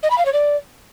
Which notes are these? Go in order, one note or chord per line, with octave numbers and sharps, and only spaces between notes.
D#5
B5
F5
C#5
D5